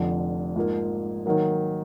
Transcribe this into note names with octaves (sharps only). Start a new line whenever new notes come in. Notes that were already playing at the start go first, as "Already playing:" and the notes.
Already playing: F1 F2 D3
G#2 F3 A#3
D#3 F#3 A#3